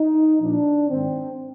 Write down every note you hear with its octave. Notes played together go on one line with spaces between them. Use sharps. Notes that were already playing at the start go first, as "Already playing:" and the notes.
Already playing: D#4
A#2 F3 D4
G#2 D#3 C4